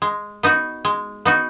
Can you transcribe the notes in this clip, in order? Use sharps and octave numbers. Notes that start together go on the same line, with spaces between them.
G#3
B3 D#4 F#4
G#3
B3 D#4 F#4